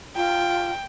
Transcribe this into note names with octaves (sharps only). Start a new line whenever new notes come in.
F4 G5